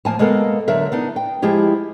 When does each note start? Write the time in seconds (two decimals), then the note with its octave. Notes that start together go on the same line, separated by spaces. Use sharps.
0.05 F3 A#3 G#5 A5
0.19 G#3 A#3 B3 A4 A#4
0.68 D3 F#3 A#4 E5
0.92 B3 D4 D#4
1.16 G5
1.42 F3 G#3 E4 G4 G#4